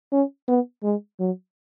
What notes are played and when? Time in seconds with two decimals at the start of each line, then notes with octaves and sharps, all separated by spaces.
0.12 C#4
0.48 B3
0.84 G#3
1.20 F#3